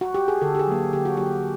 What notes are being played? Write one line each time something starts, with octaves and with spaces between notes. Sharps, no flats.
F#4
G4
G#4
D3 A4
G4
G#4
F#3 A#3
D3 G4
F#4
F#3 A#3 G4